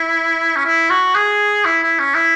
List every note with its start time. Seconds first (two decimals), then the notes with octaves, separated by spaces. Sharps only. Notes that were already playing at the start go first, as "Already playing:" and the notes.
Already playing: E4
0.56 C#4
0.65 E4
0.90 F#4
1.15 G#4
1.65 E4
1.83 E4
2.00 C#4
2.15 E4